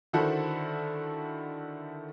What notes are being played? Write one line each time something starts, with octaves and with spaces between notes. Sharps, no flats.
D3 D#3 E4 F#4 A4 C5